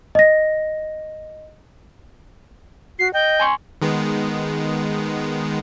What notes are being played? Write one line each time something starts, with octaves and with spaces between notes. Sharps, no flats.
D#5 A#6
F#4 C7
D#5 G5
G#5 C6 C#6
D#3 G#3 B3